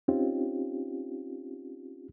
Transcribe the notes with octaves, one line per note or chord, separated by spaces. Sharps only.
C4 C#4 D#4 F4 G4